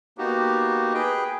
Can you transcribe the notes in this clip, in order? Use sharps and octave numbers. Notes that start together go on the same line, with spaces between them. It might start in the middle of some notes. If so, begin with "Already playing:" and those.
A#3 B3 D#4 F#4 G4
G#4 B4 G5